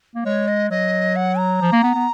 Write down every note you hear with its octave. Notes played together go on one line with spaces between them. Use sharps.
A#3
G#3 C#5
D#5
F#3 D#5
F#5
A#5
F3
A#3
B3
B3